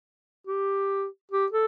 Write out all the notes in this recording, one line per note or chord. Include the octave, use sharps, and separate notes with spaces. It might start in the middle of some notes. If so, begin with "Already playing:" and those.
G4
G4
A4